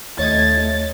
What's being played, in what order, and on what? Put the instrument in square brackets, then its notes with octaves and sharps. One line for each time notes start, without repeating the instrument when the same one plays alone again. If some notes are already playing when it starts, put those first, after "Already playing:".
[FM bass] D#2 [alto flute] A3 [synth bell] C#5 D#5 G#6 [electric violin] A6